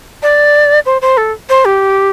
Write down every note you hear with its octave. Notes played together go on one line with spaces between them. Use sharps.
D5
C5
C5
A4
C5
G4